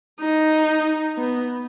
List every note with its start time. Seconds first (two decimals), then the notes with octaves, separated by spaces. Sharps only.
0.20 D#4
1.18 B3